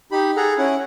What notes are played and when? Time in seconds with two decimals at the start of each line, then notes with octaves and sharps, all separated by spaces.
0.12 D#4 G4 B5
0.37 G#4 A4 F#5 A#5
0.58 C#4 E4 F#5